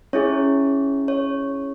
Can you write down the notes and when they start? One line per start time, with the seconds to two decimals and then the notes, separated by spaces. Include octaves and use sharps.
0.13 C#4 E4 G#4 C#5
1.08 C#5